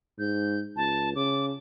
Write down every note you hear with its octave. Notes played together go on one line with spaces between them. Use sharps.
G#2 G6
C#2 A5
C#3 D6